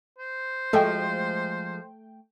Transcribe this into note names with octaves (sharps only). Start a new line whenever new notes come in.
C5
F3 G#3 A3 F#4 G5